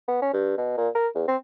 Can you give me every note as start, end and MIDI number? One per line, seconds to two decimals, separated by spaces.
0.08 0.20 59
0.22 0.32 61
0.33 0.56 43
0.58 0.72 47
0.77 0.89 46
0.95 1.08 70
1.15 1.25 40
1.28 1.36 60